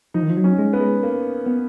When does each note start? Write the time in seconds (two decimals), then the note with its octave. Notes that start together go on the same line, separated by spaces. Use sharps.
0.14 F3 D#4
0.23 D#3
0.30 F3
0.37 F#3
0.44 C#4
0.58 G#3
0.73 B3
0.80 G#3
1.03 A#3
1.46 B3